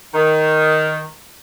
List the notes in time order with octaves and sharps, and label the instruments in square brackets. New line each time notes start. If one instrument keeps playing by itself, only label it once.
[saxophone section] D#3